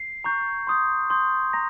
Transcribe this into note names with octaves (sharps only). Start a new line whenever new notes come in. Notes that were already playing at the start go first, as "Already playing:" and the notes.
Already playing: C7
A#5 C#6 G6
C6 D#6 G6
C6 D#6 G6
A#5 A#6